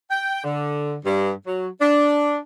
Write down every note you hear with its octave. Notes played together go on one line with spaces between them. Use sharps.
G5
D3
G2
F#3
D4